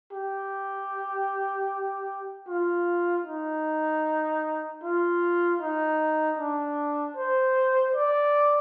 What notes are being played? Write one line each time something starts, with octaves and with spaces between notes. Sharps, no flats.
G4
F4
D#4
F4
D#4
D4
C5
D5